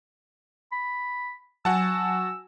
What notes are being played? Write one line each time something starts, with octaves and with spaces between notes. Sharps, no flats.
B5
F#3 F#4 F#5 G#5 A5 E6